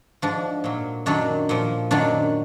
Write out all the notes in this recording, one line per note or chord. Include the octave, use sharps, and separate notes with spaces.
G#2 F3 D4
A#2 F#3
F#2 D#3 F#3 D4
A#2 F3
F#2 D#3 F#3 D4